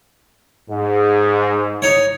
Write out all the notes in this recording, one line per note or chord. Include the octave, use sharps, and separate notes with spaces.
G#2
D#4 C#5